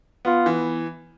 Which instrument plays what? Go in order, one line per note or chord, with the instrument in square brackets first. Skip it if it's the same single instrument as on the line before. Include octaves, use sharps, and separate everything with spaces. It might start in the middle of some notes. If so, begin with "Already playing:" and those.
[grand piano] B3 [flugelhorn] F4
[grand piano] E3